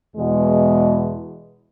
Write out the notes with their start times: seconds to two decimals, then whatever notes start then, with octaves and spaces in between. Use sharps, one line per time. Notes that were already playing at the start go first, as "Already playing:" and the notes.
0.17 E2 B2 E3 G#3